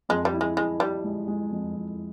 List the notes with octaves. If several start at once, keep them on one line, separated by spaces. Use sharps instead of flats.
F2 G#3
G3
E4
G#3
G#3 E4
G3 E4
G#3
G#3
F2
F2